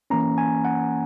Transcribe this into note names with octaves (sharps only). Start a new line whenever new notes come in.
E3 A#3 C#4 A#5
G#5
F#5